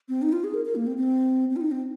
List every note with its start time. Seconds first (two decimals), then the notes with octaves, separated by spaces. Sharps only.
0.09 C4
0.22 D#4
0.33 F4
0.44 G#4
0.54 A#4
0.65 A#4
0.75 A#3
0.87 C4
0.97 C4
1.50 C4
1.56 F4
1.61 D#4
1.71 C4